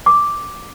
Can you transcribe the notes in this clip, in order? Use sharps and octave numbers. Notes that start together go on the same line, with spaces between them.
D6